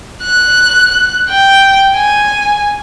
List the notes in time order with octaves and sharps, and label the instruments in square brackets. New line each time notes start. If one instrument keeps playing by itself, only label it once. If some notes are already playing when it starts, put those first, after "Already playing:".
[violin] F#6
G5
G#5